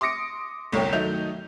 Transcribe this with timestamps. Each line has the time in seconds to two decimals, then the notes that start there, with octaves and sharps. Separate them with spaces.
0.01 C6 D6 D#6 A#6 C#7 D7
0.72 G1 C2 C#5 G5
0.93 D#3 F#3 A3 D#4 G6 F7